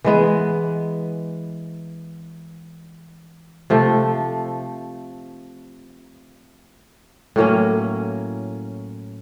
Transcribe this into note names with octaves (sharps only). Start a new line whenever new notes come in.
E3 G#3 B3
C3 F3 A3
A2 F#3 A#3 C#4